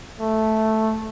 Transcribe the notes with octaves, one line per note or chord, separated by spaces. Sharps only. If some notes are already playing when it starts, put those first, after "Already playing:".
A3